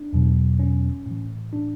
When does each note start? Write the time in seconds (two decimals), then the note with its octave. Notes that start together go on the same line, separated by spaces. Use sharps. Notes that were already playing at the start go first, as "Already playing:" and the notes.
Already playing: D4
0.13 E2 B2 F#3
0.59 C#4
1.06 A2 E3
1.53 D4